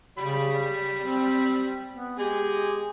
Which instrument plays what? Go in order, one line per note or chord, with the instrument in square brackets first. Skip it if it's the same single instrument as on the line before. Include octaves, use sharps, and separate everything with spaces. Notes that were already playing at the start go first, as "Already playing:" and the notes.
[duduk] C#3 [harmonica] G3 B5
[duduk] C4
B3
[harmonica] G#3 G#4 [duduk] G4